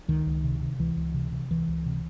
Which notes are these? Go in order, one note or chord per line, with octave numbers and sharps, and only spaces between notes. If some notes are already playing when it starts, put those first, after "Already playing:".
C#2 D#3
C#2
C3
C3
C#2 E3
C#2
C3
C3
C#2 E3
C#2
C3